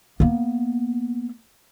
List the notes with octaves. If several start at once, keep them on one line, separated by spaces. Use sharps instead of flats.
A#3 B3